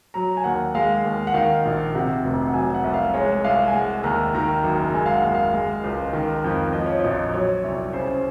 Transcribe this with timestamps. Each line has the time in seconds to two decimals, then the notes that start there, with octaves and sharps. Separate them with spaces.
0.14 F#3 A#5
0.37 G#5
0.44 D#2 F#5
0.75 G#3 F5
1.05 D#2
1.27 F#5
1.34 D#3 F5
1.65 A#1
1.95 C3 F#5
2.24 F1
2.48 F#5
2.54 F#3 G#5
2.74 F#5
2.84 C2
2.94 F5
3.14 G#3 C#5
3.44 C2 F5
3.68 G#5
3.73 G#3 F#5
4.03 D#2 A#5
4.35 D#3 A#5
4.64 F#1
4.94 G#3 G#5
5.06 F5
5.14 F#5
5.23 D#2
5.34 F5
5.53 G#3
5.84 C#2
6.13 D#3
6.44 F2
6.73 F3 D#5
6.86 C#5
7.00 A#1 D#5
7.33 F#3 C#5
7.64 C2
7.93 C#3 C5